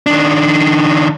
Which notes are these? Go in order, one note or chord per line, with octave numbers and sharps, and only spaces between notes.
D#3 D4